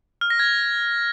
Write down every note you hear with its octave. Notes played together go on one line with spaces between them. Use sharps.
F6
A#6
G#6